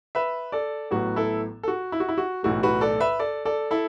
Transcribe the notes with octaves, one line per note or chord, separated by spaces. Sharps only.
B4 E5
A4 D5
A1 A2 F#3 B3 F#4
E4 A4
A4
F#4
E4
F#4
E4
F#4
B1 A2 E3 A3 F#4
F#4 B4
A4 D5
B4 E5
A4 D5
A4 D5
E4 A4